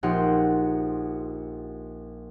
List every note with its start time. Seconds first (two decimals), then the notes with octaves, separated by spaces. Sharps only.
0.03 A#1 D#4 G4 F#5 C6